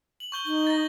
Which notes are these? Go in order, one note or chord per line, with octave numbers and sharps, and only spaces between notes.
F#7
C#6 G6 G7
D#4 C#6 G7
A6 A#6